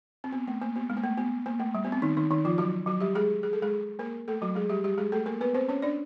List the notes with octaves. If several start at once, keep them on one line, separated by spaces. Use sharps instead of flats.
C4
B3
A3
A#3
B3
G#3
A#3
A3
B3
A#3
A3
G3
B3
C4
D#3 D#4
D#3 D#4
D#3 D#4
F3 F4
F#3 F#4
F#3 F#4
G3 G4
G#3 G#4
G#4
A4
G#3 G#4
A#3 A#4
A3 A4
F#3 F#4
G#3 G#4
G3 G4
G3 G4
G#3 G#4
A3 A4
A#3 A#4
B3 B4
C4 C5
C#4 C#5
D4 D5